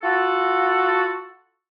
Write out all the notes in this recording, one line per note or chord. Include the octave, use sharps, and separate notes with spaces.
F4 F#4 A4